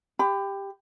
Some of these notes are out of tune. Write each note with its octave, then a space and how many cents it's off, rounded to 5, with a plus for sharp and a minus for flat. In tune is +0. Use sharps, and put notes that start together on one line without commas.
G4 +10 B5 +30